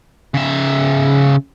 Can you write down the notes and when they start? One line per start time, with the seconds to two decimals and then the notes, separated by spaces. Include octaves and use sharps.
0.34 C#3 E5